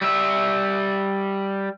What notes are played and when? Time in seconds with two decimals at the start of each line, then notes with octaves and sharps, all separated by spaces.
0.01 G3 E5